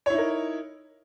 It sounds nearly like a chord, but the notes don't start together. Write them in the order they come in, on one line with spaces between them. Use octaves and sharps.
C#5 E4 D#4 A#4